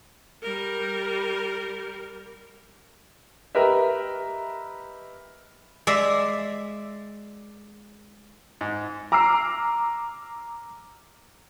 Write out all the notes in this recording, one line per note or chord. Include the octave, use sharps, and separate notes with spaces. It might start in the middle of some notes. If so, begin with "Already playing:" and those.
G3 A#4
G4 A#4 B4 D#5 E5
G#3 D5 E5
G#2
A#5 D6 E6 F6 C7